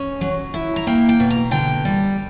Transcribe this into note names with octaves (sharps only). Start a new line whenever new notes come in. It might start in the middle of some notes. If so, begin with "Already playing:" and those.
Already playing: C#4
F#3
E4
A#5
A#3 G5
G5
B2
A#5
D3 G5
G3